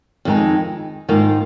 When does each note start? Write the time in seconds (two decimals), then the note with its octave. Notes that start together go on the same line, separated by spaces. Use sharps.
0.25 F2 D#3 G#3 D#4
1.09 G#2 D#3 A#3 F4